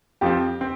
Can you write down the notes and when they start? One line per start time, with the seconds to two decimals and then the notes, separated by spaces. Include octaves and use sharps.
0.21 F2 F3 C4 G4
0.61 C4